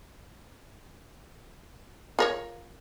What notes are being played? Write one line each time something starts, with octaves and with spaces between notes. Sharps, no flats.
F4 A#4 C#5